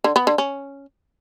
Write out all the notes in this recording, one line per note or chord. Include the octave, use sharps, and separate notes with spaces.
D3
B3
D3
C#4